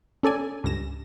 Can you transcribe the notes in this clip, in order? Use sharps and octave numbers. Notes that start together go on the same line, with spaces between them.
C#4 A4 D5 G#5
C#2 G2 A#6 E7